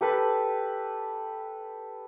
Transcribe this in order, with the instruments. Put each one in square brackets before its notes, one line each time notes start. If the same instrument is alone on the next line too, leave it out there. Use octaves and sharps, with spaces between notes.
[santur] G4 A4 B4